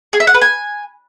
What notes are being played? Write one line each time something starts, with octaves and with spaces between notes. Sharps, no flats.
G#4
E5
F#5
B4
G#5